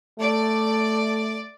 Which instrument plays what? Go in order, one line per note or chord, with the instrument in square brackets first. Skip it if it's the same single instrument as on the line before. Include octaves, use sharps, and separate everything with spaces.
[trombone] A3 [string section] D5